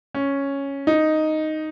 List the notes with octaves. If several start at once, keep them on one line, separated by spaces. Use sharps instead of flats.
C#4
D#4